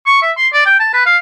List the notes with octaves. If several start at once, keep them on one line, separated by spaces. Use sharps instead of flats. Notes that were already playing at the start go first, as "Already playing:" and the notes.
C#6
E5
C6
D5
G5
A5
B4
F5